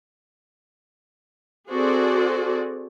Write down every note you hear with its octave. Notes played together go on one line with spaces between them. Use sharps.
C4 F#4 G#4 A4 C5 D5